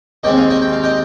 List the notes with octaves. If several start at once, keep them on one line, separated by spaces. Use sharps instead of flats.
D#2 D#3 G#3 C4 D#5 G5
F5 G#5
D#5 G5
G5
F5
D#5 G5